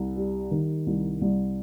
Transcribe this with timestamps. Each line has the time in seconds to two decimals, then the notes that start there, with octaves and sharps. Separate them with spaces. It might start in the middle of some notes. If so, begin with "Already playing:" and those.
Already playing: C2
0.16 G3
0.51 D#3
0.87 C2
1.21 C2